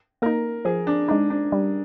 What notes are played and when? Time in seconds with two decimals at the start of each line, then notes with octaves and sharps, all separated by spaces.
0.22 A#3 D#4 A#4
0.65 F3 G#4
0.87 D4
1.08 G#3 D4 D#4
1.30 D4
1.52 G3